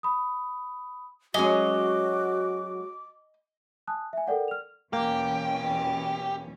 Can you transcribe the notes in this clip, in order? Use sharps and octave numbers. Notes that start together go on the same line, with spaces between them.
B5 D#6
F#3 G#3 C#4 F#4 D#5 G#5 D6
G#5 A5 D#6 F#6
E5 G#5
A4 A#4 D5 F#5 G5
F6 F7
E2 B2 A#3 C#4 G4